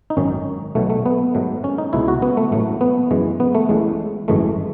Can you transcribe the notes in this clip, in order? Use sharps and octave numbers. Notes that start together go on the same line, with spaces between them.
D#4
G#1 F#2 D#3 C#4
B1 B2 F#3 A3
A3
B3
G#2 D#3 F#3 A3
C#4
D#4
C#2 B2 G#3 E4
F#4
B3
A3
A1 A2 F#3 A3
B3
F#2 E3 G#3
B3
A3
A1 A2 G#3
G#1 F#2 E3 G#3 A3